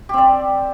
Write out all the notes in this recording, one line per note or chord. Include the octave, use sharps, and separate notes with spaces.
C4 G4 D5